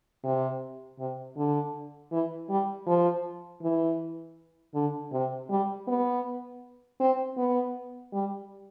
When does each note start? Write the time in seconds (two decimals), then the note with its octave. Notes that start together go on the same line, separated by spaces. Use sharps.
0.24 C3
0.99 C3
1.37 D3
2.12 E3
2.49 G3
2.87 F3
3.62 E3
4.75 D3
5.12 C3
5.50 G3
5.87 B3
7.00 C4
7.37 B3
8.13 G3